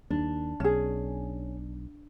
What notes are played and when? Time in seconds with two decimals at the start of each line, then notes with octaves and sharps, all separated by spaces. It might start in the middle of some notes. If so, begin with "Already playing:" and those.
0.10 D#2 D4
0.60 B1 C#4 G#4